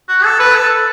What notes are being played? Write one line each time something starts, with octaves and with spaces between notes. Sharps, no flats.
F#4
A4
B4
A4